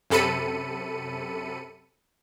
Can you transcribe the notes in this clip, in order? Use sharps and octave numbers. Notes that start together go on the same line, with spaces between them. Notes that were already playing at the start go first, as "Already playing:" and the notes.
F#2 C3 A4 B5 C#7 D#7